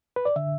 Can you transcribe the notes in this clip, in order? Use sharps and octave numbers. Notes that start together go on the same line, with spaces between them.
B4
D5
D3 E5